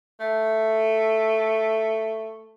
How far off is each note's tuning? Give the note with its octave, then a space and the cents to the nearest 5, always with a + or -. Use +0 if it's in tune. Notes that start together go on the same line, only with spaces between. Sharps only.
A3 +5